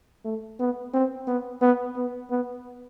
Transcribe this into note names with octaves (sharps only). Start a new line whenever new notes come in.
A3
B3
C4
B3
B3
B3
B3